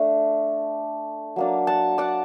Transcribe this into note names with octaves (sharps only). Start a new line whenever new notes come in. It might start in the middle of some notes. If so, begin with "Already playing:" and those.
Already playing: A3 D4
F#3 A#3 D4
F#5 A5
D5 F#5